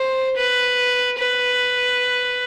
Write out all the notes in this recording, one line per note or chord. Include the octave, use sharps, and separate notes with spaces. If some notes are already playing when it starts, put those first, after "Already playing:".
Already playing: C5
B4
B4